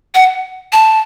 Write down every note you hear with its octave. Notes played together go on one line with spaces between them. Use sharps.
F#5
A5